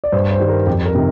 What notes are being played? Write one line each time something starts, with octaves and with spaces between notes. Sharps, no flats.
D5
G2 C5
C5
D#3 G3
A#4
F2 G4
A#4
C3 D#3